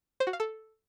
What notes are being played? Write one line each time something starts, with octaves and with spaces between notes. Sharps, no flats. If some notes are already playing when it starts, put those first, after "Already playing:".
C5
F#4
F5
A4